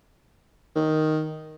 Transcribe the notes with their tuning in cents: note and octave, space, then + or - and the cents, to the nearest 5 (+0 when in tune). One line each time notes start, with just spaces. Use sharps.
D#3 +0